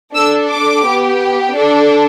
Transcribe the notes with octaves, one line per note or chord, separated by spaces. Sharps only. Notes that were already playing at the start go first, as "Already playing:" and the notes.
D4 A4 E6
D6
B3 G4
D4 A4